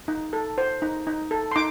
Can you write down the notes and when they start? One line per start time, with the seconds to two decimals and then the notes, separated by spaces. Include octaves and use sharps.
0.08 D#4
0.33 A4
0.58 C5
0.82 D#4
1.07 D#4
1.31 A4
1.51 C6
1.56 D#4 D6